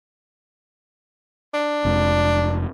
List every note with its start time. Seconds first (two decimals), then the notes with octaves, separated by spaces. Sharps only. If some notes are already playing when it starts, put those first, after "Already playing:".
1.54 D4
1.85 F1 F2 G#3